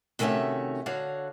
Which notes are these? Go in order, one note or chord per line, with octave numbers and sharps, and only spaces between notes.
C3 D#3 A3 C#4 F#4 E5
D3 F#4 C#5 F5